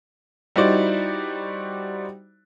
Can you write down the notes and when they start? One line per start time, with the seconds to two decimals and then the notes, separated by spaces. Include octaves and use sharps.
0.56 G3 D#4 E4 F#4 C5 D5